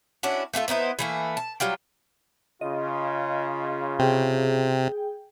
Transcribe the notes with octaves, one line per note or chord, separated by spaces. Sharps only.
C#4 D4 E4 F#4
A3 D4 F4 A4
B3 D#4 E4 C5
E3 A3 A#3
A5
F#3 G3 F4 G5
C#3 F4 D#5
C3 G#4 G5